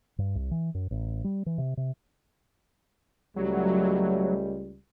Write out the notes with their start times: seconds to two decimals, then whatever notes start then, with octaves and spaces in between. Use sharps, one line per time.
0.18 G2
0.35 C2
0.51 E3
0.75 F#2
0.91 A1
1.24 G3
1.46 E3
1.58 C3
1.77 C3
3.36 C#2 F#3 G3 A3